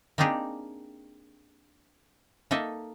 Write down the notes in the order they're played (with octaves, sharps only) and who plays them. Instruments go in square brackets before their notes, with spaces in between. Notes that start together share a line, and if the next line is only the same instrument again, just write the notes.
[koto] A#3 C4 D4 D#4 G4 G#4
A#3 D#4 A4 D#5 E5